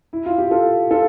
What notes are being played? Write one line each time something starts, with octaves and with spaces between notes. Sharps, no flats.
E4
F4
G4
F4 A4
F4 A4